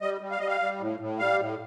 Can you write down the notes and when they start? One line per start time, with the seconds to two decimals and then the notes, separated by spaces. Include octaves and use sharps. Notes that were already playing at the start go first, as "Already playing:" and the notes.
0.01 G3 D#5
0.21 G3
0.31 F5
0.39 G3 D#5
0.48 F5
0.61 G3
0.80 A2
1.00 A2
1.19 G3 F5
1.39 A2